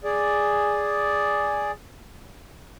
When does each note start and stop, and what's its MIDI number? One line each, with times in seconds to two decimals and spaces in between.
0.04 1.71 68
0.04 1.71 74